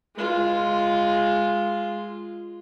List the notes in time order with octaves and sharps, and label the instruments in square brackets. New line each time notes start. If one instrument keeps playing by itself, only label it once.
[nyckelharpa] G#3 F4